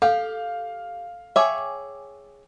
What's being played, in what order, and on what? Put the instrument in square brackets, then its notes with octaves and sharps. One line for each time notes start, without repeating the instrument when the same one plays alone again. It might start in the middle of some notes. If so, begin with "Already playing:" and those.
[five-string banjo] G4 [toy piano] A4 [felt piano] F5
[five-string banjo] G#4 C#5 E5 [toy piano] G5 G#5 D6